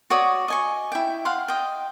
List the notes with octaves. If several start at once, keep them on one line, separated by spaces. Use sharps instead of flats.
F#4 C#5 D5 D#6
D#5 G#5 C#6
E4 G5
F5 F#5 C6
D#5 G5